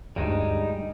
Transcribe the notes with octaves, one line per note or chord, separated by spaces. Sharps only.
D2 G2 G3 G#3 D#4